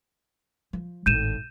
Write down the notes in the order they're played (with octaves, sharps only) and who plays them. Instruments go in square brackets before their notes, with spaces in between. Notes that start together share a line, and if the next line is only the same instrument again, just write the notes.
[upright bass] F3
[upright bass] G#1 A2 [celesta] G6 D#7 E7